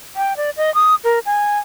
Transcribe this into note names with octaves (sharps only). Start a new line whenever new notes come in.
G5
D5
D#5
D#6
A#4
G#5